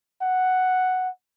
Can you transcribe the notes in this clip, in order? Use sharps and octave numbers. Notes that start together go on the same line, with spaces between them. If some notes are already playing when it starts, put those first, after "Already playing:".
F#5